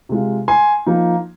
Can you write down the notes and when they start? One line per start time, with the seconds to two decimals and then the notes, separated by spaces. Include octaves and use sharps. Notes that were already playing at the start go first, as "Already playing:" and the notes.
0.09 C3 G#3 F4
0.48 G#5 C6
0.86 F3 A#3 D#4